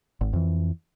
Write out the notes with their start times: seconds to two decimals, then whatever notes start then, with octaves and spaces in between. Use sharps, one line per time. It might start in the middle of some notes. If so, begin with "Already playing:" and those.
0.21 G#1
0.33 F2 E3